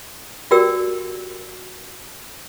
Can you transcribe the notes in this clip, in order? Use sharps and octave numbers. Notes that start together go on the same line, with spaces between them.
F#4 G4 A#4 D5 G5 E6